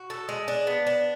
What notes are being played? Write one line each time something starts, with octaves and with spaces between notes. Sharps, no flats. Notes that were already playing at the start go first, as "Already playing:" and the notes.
Already playing: F#4
A4
G#3
D4
B3
D4